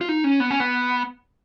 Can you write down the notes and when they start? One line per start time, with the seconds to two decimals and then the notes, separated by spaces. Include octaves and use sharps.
0.01 F4
0.09 D#4
0.24 C#4
0.40 B3
0.51 C#4
0.60 B3